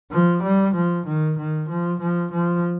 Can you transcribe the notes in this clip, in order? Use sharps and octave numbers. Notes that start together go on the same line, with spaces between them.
F3
G3
F3
D#3
D#3
F3
F3
F3